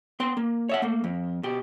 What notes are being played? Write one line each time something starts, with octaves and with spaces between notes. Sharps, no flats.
B3 G5 C6
A#3
C#5 E5 F#5
A3 A#3
F2
B2 G4